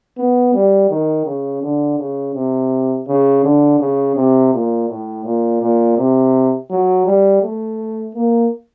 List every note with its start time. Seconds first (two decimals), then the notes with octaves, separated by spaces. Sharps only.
0.18 B3
0.54 G3
0.90 D#3
1.26 C#3
1.63 D3
1.99 C#3
2.35 C3
3.08 C#3
3.44 D3
3.80 C#3
4.16 C3
4.53 A#2
4.89 A2
5.25 A#2
5.61 A#2
5.98 C3
6.70 F#3
7.06 G3
7.43 A3
8.15 A#3